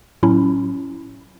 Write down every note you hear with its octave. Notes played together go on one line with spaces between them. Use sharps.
A2 F#3 C#4 E4